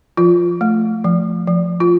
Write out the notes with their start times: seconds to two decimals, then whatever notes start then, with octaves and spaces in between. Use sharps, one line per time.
0.17 F3 F4
0.61 A3
1.04 F3
1.47 F3
1.80 F4